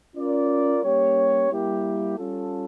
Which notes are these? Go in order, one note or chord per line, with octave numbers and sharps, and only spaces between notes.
C#4 F4 A#4 D5
G3 A#3 C#4 G4 C#5
G3 A#3 E4 G4
G3 C#4 F4 A4